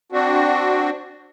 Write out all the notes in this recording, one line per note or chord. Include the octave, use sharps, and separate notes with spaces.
C4 D4 F#4